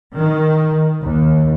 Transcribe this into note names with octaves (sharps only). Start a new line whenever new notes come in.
D#3
D#2